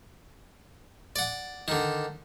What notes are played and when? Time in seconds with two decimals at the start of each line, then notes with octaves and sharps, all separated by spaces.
1.16 D5 F#5
1.68 D3 D#3